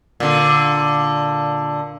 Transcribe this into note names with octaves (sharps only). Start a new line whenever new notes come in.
A#2 D3